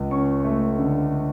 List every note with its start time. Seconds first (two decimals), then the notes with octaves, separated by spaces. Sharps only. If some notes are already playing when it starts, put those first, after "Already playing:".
Already playing: C#2
0.11 C#4 C#6
0.45 A3
0.79 D3